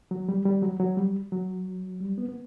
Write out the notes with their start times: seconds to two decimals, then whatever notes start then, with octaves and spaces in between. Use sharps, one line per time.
0.11 F#3
0.29 G3
0.46 G3
0.62 F#3
0.80 F#3
0.97 G3
1.32 F#3
2.00 G3
2.18 B3
2.29 B3